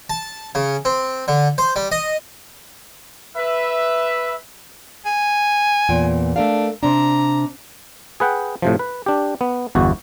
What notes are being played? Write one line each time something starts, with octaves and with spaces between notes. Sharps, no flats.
A5
C#3
C4
D3
C5
G3
D#5
B4 E5
G#5
E2 A#2 G5
A3 D4 A#4 F5
C3 D4 A#5
G#4 B4 F#5 G5
A2 C3 F3
B4
D4 G4
B3
G1 E2 F#4